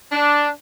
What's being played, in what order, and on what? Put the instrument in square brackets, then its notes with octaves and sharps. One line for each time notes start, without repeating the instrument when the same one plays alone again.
[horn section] D4